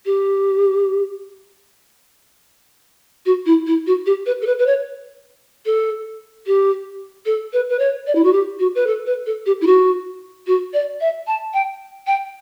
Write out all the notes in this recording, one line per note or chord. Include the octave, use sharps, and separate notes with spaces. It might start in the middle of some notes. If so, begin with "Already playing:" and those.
G4
F#4
E4
E4
F#4
G4
B4
A4
B4
B4
C#5
A4
G4
A4
B4
B4
C#5
D5
E4
F#4
G4
F#4
B4
A4
B4
A4
G4
E4
F#4
F#4
D5
E5
A5
G5
G5